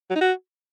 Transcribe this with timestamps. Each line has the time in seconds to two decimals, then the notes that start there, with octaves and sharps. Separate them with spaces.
0.10 F#3
0.16 D#4
0.21 F#4